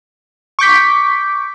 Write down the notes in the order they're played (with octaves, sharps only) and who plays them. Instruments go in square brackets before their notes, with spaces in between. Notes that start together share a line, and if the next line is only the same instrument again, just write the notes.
[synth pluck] C#6 D6 G6 B6